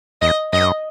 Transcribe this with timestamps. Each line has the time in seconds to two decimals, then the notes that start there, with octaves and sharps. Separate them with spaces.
0.22 E2 D#5
0.53 F#2 D#5